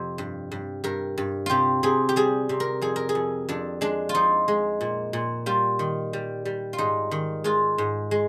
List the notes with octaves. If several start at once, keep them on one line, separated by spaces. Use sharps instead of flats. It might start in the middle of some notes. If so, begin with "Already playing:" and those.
Already playing: F2 C3
G2
G2
G2 A#4
G2
C3 F4 G4
C3 G#4
G4
G3 G#4
C3
A#4
F2 G#4
A#4
G#4
F2
F2 D4
G#3 D4
F4
F3 D#4
G#3
A#2
A#2
G3 F4
D#3
G3
G3
F4
G#2 D#4
D#3
G#3 F4
G#2
G#3